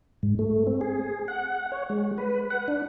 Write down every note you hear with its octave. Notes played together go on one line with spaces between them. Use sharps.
G#2
A3
C4
G#4
F#5
C#5
G#3
B4
F#5
D4